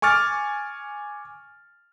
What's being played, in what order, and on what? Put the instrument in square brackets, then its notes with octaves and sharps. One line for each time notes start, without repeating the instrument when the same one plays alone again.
[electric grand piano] G#5 C#6 D6 F6 A6